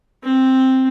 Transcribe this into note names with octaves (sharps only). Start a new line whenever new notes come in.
C4